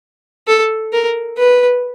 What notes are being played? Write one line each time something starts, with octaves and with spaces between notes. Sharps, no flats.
A4
A#4
B4